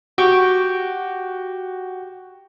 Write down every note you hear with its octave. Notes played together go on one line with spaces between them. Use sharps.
F#4 G4 C#6 D6